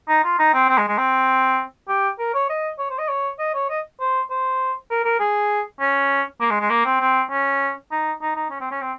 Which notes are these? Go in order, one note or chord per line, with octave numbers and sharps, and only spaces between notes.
D#4
F4
D#4
C4
C4
G#3
G#3
C4
G4
A#4
C#5
D#5
C#5
C5
D#5
C#5
D#5
C#5
D#5
C5
C5
A#4
A#4
G#4
C#4
A#3
G#3
G#3
A#3
C4
C4
C#4
D#4
D#4
D#4
C#4
C4
C#4
C4